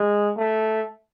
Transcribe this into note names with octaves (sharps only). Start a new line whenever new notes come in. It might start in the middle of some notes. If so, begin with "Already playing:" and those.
Already playing: G#3
A3